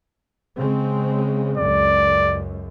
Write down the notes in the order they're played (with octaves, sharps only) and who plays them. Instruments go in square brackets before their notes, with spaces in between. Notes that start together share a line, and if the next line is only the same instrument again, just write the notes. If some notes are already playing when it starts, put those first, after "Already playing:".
[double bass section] C#3 G#3 C4
[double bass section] C#2 F#2 [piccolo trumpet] D5